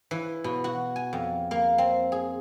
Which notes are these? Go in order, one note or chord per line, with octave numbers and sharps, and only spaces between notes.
E3
B2
F#4
G#5
F2
A#3
C4
G#4